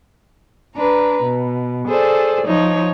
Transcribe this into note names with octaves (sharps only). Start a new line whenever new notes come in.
D4 B4 A#5
B2
G#4 A4 C5 D5
F3 D#4 C#5